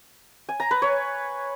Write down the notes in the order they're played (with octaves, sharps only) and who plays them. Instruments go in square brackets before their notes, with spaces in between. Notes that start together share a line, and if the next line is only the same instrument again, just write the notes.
[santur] G#5
A#5
B4
C#5